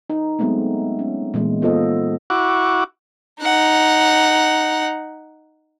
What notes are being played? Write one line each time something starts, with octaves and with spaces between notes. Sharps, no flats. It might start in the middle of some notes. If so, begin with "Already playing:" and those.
D#4
F#3 G#3 A3 B3 C4
C#4
A#2 E3 G#3 B3
B3 F4 A4 C5 D#5
E4 F#4 F#5 C#6 D6
D#4 F#5